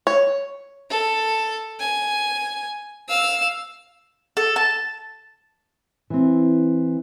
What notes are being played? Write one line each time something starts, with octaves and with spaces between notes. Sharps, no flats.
C#5
A4
G#5
F5 E6
A4
A5
E3 C4